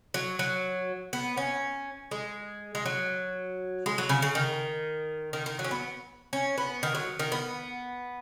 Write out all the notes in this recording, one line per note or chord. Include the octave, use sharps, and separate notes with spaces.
F#3
F#3
B3
C#4
G#3
G#3
F#3
G#3
F#3
C#3
C#3
D#3
D#3
D#3
F#3
C#4
B3
C#4
B3
D#3
F#3
D#3
B3